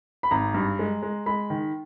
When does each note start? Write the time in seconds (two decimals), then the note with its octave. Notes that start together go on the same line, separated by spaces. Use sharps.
0.23 B5
0.31 G#1 A#5
0.54 G2
0.79 G#3
1.03 G#3
1.26 G#3 B5
1.50 D#3